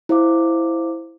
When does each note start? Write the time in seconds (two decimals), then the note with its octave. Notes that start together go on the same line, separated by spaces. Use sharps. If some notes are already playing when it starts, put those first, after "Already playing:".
0.09 E4 C5 F5 D6